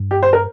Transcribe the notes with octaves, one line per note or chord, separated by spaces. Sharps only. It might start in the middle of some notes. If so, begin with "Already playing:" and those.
Already playing: G2
G4
C5
A#4